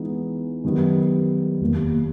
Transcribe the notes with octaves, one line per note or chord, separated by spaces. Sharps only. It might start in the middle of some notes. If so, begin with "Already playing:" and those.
Already playing: E3 G#3 B3 D#4
F#2 D#3 G3 B3
F1 D#2 D#3 G3 A#3